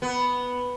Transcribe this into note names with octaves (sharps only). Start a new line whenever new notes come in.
B3